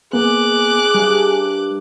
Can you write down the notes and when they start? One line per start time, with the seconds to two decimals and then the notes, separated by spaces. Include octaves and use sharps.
0.13 A#3 B3 G#4 D6 F#6
0.94 G2 G3 A#4